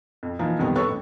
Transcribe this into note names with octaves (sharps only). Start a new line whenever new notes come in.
F2
E3 F3 A#3 D#4
C2 F2 D#3 G3 B3
A4 B4 C#5 C#6
A1